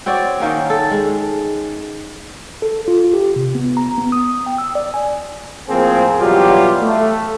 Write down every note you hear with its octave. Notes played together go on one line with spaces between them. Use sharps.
C4 F#4 C#5 D5
D#3 A#3 C#4
A4
G#3
A4
F4
G4
C3
B3
A#5
B3
D#6
G5
E6
D5
G#5
A2 F3 A#3 C4 G#4
B2 E3 F#3 G3 F4 G4
A3